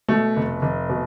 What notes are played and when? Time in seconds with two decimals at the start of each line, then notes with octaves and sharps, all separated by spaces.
0.08 B2 A3
0.36 F1
0.62 F1
0.90 B2